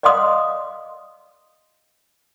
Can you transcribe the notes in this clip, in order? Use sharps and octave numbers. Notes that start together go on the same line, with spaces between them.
D5 D#5 F5 C6 D#6